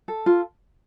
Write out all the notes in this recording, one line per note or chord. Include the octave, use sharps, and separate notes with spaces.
A4
F4